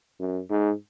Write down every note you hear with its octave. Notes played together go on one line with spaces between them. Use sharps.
F#2
G#2